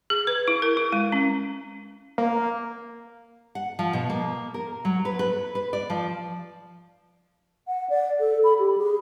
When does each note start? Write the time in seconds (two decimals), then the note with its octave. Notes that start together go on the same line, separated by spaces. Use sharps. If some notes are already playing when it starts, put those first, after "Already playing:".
0.10 G#4
0.27 B4
0.48 E4
0.62 A#4
0.77 E4
0.92 G#3
1.12 C#4
2.18 A#3
3.55 F#5
3.79 F3
3.93 B2
4.10 A#3
4.54 A#4
4.85 F#3
5.05 B4
5.19 B4
5.55 B4
5.73 D5
5.90 F3
7.67 F#5
7.90 D5
8.20 A4
8.44 B5
8.59 G4
8.78 G#4